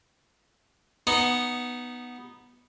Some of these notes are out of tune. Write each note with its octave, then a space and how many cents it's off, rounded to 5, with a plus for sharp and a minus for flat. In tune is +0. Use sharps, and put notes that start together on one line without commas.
B3 -5 D#4 -5